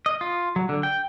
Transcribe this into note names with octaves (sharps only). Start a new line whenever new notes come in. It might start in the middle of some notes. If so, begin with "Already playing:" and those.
D#5
F4
F#3
D3
G5